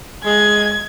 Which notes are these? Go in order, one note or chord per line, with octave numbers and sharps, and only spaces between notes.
G#3 G#6